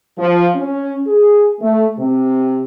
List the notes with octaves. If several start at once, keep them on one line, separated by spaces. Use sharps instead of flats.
F3
C#4
G#4
A3
C3